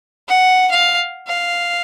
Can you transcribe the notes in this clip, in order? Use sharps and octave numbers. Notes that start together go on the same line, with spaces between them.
F#5
F5
F5